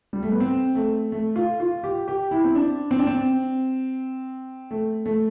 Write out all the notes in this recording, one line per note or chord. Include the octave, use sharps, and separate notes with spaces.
G3
A3
B3
C4
A3
A3
F4
F4
G4
G4
E4
C4
D4
C4
D4
C4
A3
A3